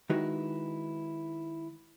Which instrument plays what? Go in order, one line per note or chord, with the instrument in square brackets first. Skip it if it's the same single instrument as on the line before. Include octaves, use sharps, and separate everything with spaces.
[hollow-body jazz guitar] D#3 G#3 D#4 E4 F#4 B4